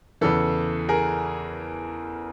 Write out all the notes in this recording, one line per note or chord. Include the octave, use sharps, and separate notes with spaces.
E2 C#3 E3 A4
G#4 A#4